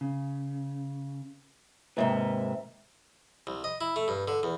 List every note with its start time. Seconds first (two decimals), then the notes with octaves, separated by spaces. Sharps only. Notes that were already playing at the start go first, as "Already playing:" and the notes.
0.01 C#3
1.97 D#2 G#2 C3 B4 E5
3.47 C2
3.64 D#5
3.81 E4
3.96 A3
4.08 G2
4.28 D3
4.43 E2